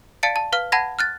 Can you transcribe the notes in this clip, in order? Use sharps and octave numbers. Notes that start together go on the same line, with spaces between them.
D5 F5 A5 A6 C#7 D7
A5
B4 F5 F6
F#5 A5 B5 G#6 A#6
F6 F#6 A6